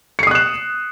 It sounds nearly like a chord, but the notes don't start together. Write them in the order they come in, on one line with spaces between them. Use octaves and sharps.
C#7 C7 D#6 F#6 E7